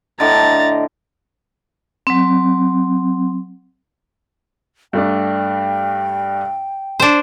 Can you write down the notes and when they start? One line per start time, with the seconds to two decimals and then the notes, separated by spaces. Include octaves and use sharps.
0.20 A2 D3 D#5 A#5 A6
2.07 F#3 C4
4.93 G2 A3 D4 G5
7.00 D4 C5